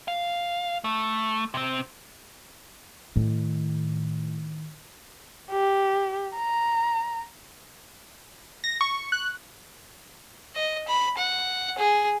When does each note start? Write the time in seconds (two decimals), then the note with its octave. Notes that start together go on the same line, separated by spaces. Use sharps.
0.08 F5
0.84 A3
1.54 C3 C4
3.16 A2 D#3
5.51 G4
6.37 A#5
8.64 A#6
8.81 C#6
9.12 F#6
10.55 D#5
10.88 B5
11.17 F#5
11.78 G#4